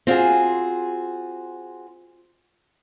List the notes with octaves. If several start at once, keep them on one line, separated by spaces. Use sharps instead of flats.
C4 F4 F#4 G#4